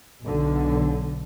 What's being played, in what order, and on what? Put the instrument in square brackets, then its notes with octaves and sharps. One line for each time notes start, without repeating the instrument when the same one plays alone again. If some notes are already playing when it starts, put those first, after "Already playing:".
[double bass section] B1 D3